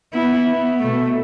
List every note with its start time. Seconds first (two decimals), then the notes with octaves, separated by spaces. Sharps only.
0.13 B3 E4
0.50 B3
0.82 B2 A3